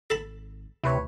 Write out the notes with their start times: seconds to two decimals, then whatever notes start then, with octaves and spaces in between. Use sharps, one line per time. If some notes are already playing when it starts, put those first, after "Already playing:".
0.10 G#1 A4 A5 B5
0.84 D2 C3 E4 B4 C#5